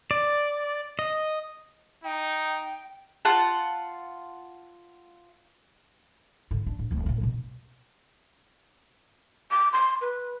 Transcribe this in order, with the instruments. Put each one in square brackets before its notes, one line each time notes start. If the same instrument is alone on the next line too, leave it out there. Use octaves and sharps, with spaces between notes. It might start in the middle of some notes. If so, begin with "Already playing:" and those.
[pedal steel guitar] D5
D#5
[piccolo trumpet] D#4 [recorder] G5
[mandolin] F4 F#5 A5
[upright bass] G#2 D3
D4
A2
D1 A3
D2 A2
B2 A#3
[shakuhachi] D6
C6
B4